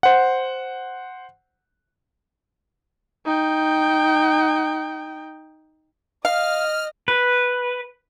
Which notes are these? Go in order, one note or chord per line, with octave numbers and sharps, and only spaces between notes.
C5 F#5
D#4 G5
D#5 F5 F6
B4